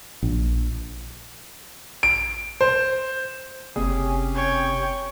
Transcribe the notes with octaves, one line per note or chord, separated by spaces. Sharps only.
A#1
D7
C5
F#1 C3 C#4 G4 G#4
C#5 G5